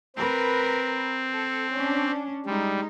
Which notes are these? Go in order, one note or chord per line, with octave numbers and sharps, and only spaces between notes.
C4 A#4 B4
A4
C#4 D4
G3 G#3 D#4